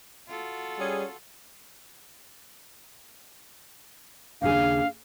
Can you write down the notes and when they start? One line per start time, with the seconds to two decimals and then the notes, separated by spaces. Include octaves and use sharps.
0.28 F4 F#4 A4
0.78 G3 C#4 G#4
4.42 D#2 C#3 D4 G#4 F5